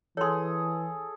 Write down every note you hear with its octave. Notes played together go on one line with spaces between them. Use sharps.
E3 G#4 A4 C#5 C6